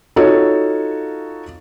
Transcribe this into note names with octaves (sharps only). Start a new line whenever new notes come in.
D#4 F4 F#4 A4 C#5